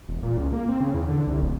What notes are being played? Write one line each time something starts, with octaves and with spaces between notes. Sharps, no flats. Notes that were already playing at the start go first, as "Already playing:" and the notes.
E1
A#2
C#2
A#3
C4
C#3
E2
D3
C2
D1